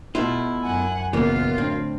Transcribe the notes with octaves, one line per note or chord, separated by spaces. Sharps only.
B2 A3 E4 F4
F#2 F#5 G#5
A#1 F#2 C#3 E3 A#3 B3 F4 F5
A2 D3 C4